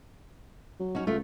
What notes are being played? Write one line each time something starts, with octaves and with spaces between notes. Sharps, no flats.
F#3
C#4 D#4 F#4
C#2 A3 F4